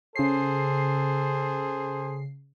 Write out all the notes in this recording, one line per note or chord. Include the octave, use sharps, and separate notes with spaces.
C#3 G#4 A4 C5 C7